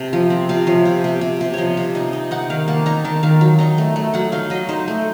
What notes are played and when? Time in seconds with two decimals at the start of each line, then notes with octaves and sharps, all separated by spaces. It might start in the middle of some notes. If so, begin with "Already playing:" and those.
Already playing: C3 A5
0.13 F3
0.30 C4
0.49 C3 F5
0.67 F3 C#5
0.85 C3
1.04 C3
1.21 C3
1.41 C3
1.54 F3 C#5 D#5
1.77 C3
1.95 D#4
2.13 D#4
2.31 D#4 F#5
2.50 D#3 F5
2.68 A#3 A5
2.86 D#4 A#5
3.05 D#3 A5
3.23 D#3 F5
3.41 F#3
3.59 D#4 A#5
3.78 A3
3.96 A3
4.14 F#3 F#5
4.32 D#4 F5
4.50 F#3 D#5
4.69 D#4 C5
4.88 A3